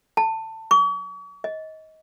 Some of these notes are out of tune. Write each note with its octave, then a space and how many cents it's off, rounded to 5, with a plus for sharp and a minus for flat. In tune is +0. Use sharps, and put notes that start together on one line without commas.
A5 +20
C#6 +45
D#5 +25